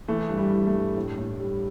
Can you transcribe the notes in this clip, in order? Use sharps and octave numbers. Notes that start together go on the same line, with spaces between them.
E3 A3
G2
G3
E3
A3
G2
A2
A2
G3